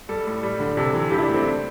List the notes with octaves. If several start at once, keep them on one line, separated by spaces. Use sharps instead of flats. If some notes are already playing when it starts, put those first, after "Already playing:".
G3 A4
A2
G3
D3
C3 A4
E3
G2 G4
E4
D4
A3
C4